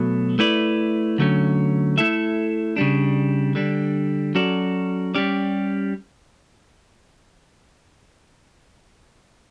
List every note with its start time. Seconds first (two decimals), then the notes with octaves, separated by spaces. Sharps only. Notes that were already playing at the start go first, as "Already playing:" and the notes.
Already playing: B2 F#3 A3
0.39 A3 E4 B4 D5
1.18 D3 F#3 A3 C#4
1.98 A3 E4 A4 E5
2.76 C#3 G3 D4
3.55 D3 G3 D4
4.35 F#3 C#4 F#4 A4 D5
5.15 G3 C#4 G4 D5